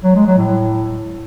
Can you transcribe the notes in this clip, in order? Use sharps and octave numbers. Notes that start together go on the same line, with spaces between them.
F#3
G#3
F#3
A2